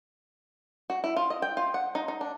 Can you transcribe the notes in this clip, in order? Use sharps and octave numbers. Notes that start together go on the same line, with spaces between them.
F#4
E4
F4
D#5
G5
F4
F#5
D#4
D#4
D4